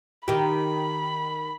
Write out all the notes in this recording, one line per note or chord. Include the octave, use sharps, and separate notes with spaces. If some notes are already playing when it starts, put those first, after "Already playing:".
D#3 G4 B5